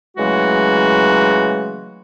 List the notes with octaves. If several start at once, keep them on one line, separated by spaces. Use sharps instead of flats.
C#3 E3 F#3 G#3 A3 F#4